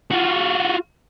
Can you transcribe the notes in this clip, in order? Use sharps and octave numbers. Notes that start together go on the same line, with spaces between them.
F4 F#4